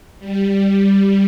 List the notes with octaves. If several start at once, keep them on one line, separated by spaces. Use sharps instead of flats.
G3